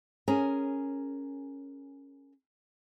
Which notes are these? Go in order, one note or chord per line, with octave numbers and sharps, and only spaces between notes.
C#4 G#4 A#4